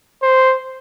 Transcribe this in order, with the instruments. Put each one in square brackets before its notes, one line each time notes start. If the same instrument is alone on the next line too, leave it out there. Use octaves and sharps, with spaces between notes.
[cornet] C5